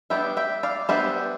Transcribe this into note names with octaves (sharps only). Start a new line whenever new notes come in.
G3 B3 D4 E5 G5
E5 G5
D5 F5
G3 B3 D4 C5 E5